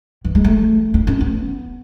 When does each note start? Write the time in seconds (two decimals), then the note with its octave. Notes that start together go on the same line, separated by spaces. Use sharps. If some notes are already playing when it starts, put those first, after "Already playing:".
0.25 E3
0.35 G#3
0.44 A3
0.94 C#4
1.07 C#4
1.21 B3